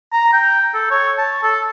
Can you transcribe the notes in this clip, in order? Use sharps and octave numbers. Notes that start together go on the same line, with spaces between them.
A#5
G5
A4
C#5
A5
A4